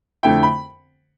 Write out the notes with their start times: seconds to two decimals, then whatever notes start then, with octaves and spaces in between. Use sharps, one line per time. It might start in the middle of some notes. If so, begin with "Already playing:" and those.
0.23 F2 D3 A3 E4 G5
0.43 B5